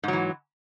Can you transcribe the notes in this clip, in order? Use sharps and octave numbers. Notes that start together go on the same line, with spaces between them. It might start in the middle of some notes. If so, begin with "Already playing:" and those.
G#2 E3 F#3